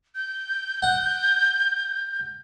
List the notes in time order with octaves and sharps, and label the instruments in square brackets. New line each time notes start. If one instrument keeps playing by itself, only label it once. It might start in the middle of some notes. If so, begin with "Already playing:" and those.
[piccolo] G6
[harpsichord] F#5